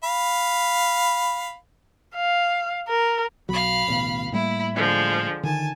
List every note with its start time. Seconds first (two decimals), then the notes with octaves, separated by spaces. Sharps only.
0.04 F5 B5
2.15 F5
2.88 A#4
3.49 B1 F#3 F5 B5
3.87 D1 A1 B2
4.32 A2 G3 A#3 E4
4.74 D3 F3 G#3
5.43 D3 D#3 G#5 A5